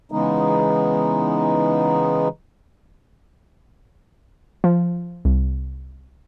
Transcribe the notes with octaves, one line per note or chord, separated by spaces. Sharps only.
C#3 E3 G#3 B3 D#4
F3
C2